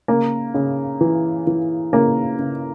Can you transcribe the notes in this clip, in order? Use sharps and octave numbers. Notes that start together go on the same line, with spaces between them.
C#3 A#3
C#3
E3
E3
C#3 A#3
C#3